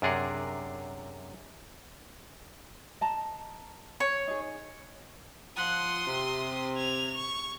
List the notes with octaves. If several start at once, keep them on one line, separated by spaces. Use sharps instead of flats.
F#2 C3 D4 G#4 A#4 F#5
D#5 A5 A#5
C#5
D#4 G#4
F3 F#5 C6 D#6
C3
G#6 F7
C#6